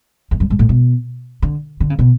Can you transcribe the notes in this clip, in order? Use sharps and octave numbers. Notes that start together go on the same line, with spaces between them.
E2
F#2
G#2
A2
B2
D3
D3
C#3
B2